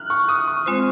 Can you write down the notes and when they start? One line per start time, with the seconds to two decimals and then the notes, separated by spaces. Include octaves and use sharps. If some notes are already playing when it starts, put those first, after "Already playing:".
Already playing: F6 F#6
0.10 C#6
0.29 D#6
0.47 C#6
0.66 G#3 C4 F4 C5